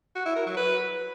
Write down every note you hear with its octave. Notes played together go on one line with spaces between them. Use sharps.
F#4
E4
A#4
F#3
B4